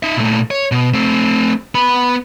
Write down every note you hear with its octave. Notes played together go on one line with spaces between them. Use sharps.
D#4 E5
A#2 A3
C#5
B2
A3 C4
B3 B5